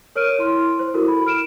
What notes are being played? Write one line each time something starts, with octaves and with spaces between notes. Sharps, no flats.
A#4 C#5 F6 D7 D#7
E4 C6 F6
C5
E4 F#4 A4 A#4
B5
F6 D7 E7